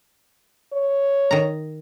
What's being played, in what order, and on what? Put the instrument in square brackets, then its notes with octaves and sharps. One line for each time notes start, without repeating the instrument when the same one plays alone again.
[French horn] C#5
[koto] D#3 A#5